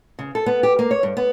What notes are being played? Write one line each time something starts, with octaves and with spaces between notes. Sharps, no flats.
C#3
A4
B3
G4
A#3
C#5
G2
B3